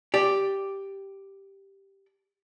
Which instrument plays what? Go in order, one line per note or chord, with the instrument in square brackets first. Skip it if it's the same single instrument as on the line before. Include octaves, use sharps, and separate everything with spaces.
[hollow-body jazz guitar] G4 D5